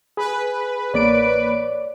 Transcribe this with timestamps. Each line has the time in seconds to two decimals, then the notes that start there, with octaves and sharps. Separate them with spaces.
0.17 G#4 B4
0.94 A1 A#3 C#5 D5 D7